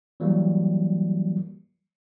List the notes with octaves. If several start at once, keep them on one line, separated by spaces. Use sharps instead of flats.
E3 F#3 G3 A#3